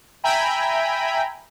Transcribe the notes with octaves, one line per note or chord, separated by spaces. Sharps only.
E5 G5 G#5 A#5 B5